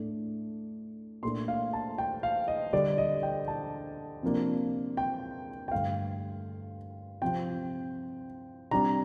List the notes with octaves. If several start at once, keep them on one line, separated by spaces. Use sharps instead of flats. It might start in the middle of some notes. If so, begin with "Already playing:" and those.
Already playing: A2 A3 D4
A#2 A3 D4 C6
F5
A5
G5
F5
D#5
D3 G3 D4 D5
D#5
G5
A5
C3 F3 A#3 D4
G5
G5
G2 D3 A3 F5
C3 F3 C4 G5
C3 G3 D4 A#5